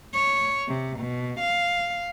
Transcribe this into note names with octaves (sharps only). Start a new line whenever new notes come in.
C#5
C3
B2
F5